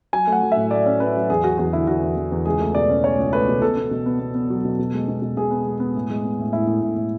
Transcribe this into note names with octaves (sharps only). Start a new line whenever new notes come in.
F#3 G#5
A3
F#5
F#3
E5
A2
A3 D5
C#4
C#4 B4
F#3
E2 G#4
F#3 F#4
E2 F#4
D3 E4
D3 F#4
E2
E2
E2
C#2 G#4
A3
B2 D5
C#4
A3 C#5
C#2
A3 B4
B2
B2 A4
B2
B2
B3
B3
B3
F#3
B2
B2
G#3
B2
B2
B2 G#4
B3
G#3
B3
A2
G#3
B3
A2
A2 E4
A2
A2
A2